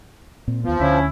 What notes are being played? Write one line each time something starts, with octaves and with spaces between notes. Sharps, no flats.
A#2 C4
D#2 F3 B3
D2 D3 C#4 E4